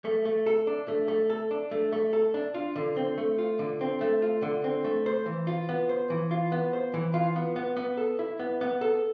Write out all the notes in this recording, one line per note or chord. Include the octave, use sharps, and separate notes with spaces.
A3
A3
A4
D4
A3
A3
A4
D4
A3
A3
A4
D4
F4
D3
C4
A3
F4
D3
C4
A3
F4
D3
C4
A3
C5
E3
F4
B3
C5
E3
F4
B3
C5
E3
F4
B3
B3
B3
A4
E4
B3
B3
A4